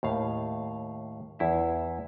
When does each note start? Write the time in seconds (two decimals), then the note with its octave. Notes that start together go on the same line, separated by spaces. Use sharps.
0.03 D#2 A2 F5
1.39 E2 E4 E5